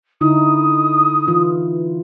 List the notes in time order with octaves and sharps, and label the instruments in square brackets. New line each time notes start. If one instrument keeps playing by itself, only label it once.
[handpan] D3 D#4 E4 [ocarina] D#6
[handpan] E3 F4